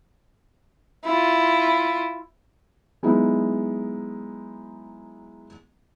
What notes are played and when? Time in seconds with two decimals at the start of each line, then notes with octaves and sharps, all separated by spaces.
1.04 E4 F4
3.03 F#3 G#3 B3 D#4 E4